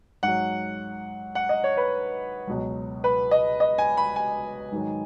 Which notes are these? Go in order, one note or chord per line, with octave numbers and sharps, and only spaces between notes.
G#2 F#3 F#5
F#5
D#5
C#5
B4
C#2 B2 F#3
B4
D#5
D#5
G#5
B5
G#5
G#2 D#3 F#3